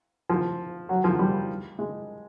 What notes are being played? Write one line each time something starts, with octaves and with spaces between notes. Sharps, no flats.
F3
F#3
F3
G3
G#3